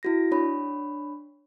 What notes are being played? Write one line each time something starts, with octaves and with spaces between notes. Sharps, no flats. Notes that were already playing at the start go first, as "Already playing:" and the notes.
E4 F#4 A#6
D4 C#5 B5